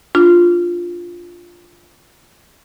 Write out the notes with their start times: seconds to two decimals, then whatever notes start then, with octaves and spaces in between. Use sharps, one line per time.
0.15 D4 F4